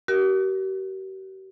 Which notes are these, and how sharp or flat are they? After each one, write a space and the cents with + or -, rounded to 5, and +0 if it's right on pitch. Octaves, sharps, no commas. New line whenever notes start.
G4 -45 A#4 +20